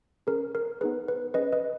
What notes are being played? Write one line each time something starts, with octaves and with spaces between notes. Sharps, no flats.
C#4 G#4 A#4
A#4
B3 D#4 G#4 B4
B4
C#4 G#4 B4 D#5
B4 D#5